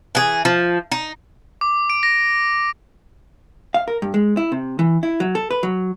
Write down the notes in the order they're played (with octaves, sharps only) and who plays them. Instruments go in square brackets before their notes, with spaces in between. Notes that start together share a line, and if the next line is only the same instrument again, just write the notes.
[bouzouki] E3 G#4
F3
D#4
[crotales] D6
D7
A#6
[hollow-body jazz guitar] F5
A#4
G2
G#3
E4
C3
E3
E4
F#3
A4
B4
F#3